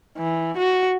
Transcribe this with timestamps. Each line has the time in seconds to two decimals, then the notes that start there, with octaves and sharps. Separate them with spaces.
0.18 E3
0.57 F#4